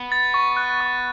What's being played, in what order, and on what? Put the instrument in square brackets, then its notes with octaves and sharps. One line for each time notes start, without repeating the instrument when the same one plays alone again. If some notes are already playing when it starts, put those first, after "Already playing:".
Already playing: [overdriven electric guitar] B3
[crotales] A6
C#6
F#6
C#6